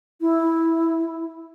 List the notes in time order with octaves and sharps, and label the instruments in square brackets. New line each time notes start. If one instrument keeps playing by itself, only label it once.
[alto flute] E4